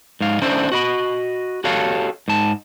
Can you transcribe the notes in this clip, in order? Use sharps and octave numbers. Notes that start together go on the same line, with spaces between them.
G#2 F5
D3 C#4 D4 E4 C5
F#4 D#5 B5
F#4 G4 A4 C#5 F5
G#2 A5